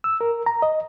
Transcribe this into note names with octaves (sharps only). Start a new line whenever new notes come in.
E6
A#4
A#5
D#5